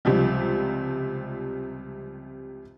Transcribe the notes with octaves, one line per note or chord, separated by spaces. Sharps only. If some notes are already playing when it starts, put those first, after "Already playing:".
C#2 C3 F3 G3